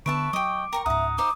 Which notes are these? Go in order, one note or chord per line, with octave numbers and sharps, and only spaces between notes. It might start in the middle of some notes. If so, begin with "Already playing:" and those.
D3 B3 B4 E5 A5 C#6 D7
F#3 D#5 G5 D6 D7
A#4 G5 A#5 C#6
C#2 G#2 E5 F#5 A#5 D#6
D#4 C5 F5 D6